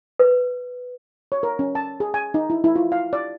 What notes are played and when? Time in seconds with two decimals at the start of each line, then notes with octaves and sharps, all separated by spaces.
0.19 B4
1.32 C#5
1.43 A#4
1.59 C#4
1.75 A5
2.00 G#4
2.14 G#5
2.34 D#4
2.50 E4
2.64 E4
2.76 F4
2.92 F5
3.13 D5